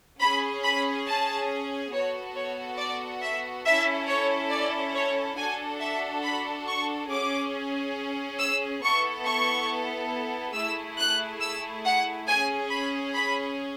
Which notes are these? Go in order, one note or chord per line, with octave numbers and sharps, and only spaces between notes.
C#4 G#4 B5
B5
A5
B3 F#4 A4 C#5
C#5
D5
E5
C#4 E4 A4 E5
C#5
D5
C#5
D4 F#4 A4 G#5
E5
B5
C#6
C#4 G#4 D6
E6
B3 E4 A4 C#6
C#6
A3 E4 G#4 E6
F#6
E6
F#5
C#4 G#4 G#5
B5
B5